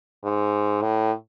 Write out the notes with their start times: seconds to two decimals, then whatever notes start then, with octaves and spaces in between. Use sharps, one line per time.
0.24 G#2
0.82 A2